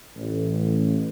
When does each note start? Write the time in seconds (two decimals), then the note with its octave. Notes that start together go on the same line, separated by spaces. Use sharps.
0.17 A1